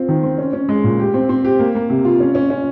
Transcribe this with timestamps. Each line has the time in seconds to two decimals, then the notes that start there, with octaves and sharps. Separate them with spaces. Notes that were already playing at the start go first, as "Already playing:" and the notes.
Already playing: C4 F4
0.08 D#3
0.23 C4
0.38 C#4
0.53 C#4
0.69 G#3
0.84 A#2
0.99 G4
1.14 C4
1.29 C4
1.44 G4
1.59 A#3
1.75 A#3
1.90 C3
2.05 F4
2.20 C#4
2.35 C#4
2.50 C#4